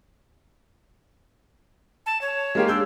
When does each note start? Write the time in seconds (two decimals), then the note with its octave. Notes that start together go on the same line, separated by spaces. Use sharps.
2.06 A5
2.21 C#5
2.55 G#3 A#3 G4
2.68 D4 E6 G6